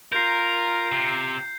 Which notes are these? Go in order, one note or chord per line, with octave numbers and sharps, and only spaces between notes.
F4 A#4 A#5 G6 C7
C3